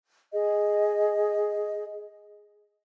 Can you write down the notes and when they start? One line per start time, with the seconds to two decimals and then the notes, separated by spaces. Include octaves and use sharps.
0.33 G#4 D#5